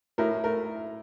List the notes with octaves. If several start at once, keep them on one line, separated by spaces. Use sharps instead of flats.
A2 A#4
A3 A#4